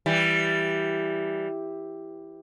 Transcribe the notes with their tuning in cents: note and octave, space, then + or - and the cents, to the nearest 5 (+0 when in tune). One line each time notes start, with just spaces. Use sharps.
E3 +0 G3 +0